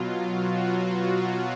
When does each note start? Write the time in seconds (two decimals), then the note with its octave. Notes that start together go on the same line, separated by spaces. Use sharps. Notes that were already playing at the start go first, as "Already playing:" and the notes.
Already playing: B2 F#3 F4
0.41 F#4